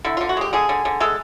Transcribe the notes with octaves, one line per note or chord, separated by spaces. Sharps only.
D3 E4
D3 F4
F#4
G#3 G4
D3 G#4
D3
D3
G#3 A4